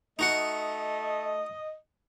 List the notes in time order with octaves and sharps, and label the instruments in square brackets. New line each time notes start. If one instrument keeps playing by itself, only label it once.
[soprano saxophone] A3 [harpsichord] D#4 F#4 F#5 [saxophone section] D#5